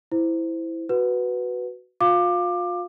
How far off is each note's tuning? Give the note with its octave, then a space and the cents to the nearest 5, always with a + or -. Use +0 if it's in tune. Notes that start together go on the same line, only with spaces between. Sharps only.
E4 +0 C5 -15
F#4 +0 B4 +0 F#5 +0
F4 +35 F5 +0 D6 +20